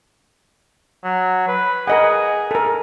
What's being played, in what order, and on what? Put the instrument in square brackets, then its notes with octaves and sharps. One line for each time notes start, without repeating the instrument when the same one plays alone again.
[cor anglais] F#3
B4
[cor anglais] G#4 [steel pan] A#4 D#5 F#5
[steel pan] A4 A#4